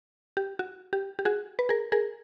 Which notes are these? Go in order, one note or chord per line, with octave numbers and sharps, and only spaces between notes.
G4
F#4
G4
G4
F#4 G#4
B4
G#4 A#4
G#4 A#4